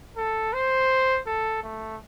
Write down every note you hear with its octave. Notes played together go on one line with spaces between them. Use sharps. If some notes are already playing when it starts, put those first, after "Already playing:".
A4
C5
A4
A3